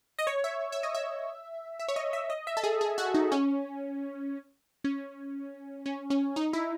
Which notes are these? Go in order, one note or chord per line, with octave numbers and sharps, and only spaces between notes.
D#5
C#5
E5
E5
D#5
E5
E5
C#5
D#5
E5
D#5
E5
A4
G#4
G#4
F#4
D#4
C#4
C#4
C#4
C#4
D#4
E4